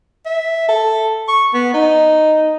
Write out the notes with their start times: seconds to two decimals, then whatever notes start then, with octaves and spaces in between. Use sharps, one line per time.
0.26 E5
0.68 A4
1.28 C#6
1.53 B3
1.74 D#4